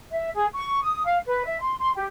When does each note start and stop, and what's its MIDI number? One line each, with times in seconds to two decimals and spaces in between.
0.12 0.29 76
0.35 0.46 68
0.53 0.80 85
0.82 1.03 87
1.04 1.17 77
1.26 1.43 71
1.44 1.57 76
1.61 1.75 84
1.80 1.90 84
1.95 2.05 67